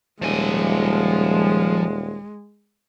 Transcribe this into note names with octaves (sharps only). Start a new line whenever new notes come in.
D#1 F3 G#3 G#5